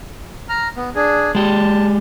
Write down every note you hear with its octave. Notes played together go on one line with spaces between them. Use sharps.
A#5 F6
B3
D4 G#4
G#3 G4 A5